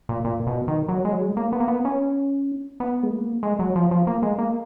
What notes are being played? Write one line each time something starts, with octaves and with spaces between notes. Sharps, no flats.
A#2
A#2
B2
D#3
F#3
G#3
F#3
G#3
A#3
B3
A#3
B3
C#4
B3
G#3
A#3
G#3
F#3
F3
F3
A#3
G#3
A#3